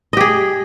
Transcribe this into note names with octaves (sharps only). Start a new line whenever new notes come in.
G4 G#4 D#5